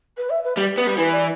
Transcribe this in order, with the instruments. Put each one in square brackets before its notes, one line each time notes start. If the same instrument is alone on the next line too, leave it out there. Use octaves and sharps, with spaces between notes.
[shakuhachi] B4
E5
B4
[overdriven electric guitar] G3 [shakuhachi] G4
[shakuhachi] G4
[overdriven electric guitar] B3
[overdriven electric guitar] G3 [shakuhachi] B4
[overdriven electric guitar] E3 [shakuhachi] B4
[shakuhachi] D5